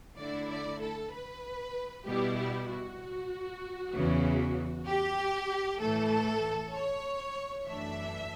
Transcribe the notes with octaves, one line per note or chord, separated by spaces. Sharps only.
D3 A3 E4 D5
D5
A4
B4
B2 G3 B3 E4 G4
G4
F#4
E2 C#3 E3
G4
A2 E3 A3 A4
C#5
F#2 E3 A3 D4 E5